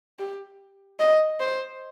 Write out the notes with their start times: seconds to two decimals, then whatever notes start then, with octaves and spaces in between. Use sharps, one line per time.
0.19 G4
1.00 D#5
1.40 C5